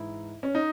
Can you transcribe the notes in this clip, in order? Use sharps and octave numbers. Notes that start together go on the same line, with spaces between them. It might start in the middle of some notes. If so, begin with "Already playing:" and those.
Already playing: G#2 E3 E4
C#4
D#4